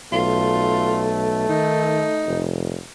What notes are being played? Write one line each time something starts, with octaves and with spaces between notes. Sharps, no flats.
B1 A3 F4
D#3 D#4
F1